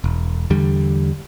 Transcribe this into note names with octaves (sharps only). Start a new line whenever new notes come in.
E1
E2 D3 G3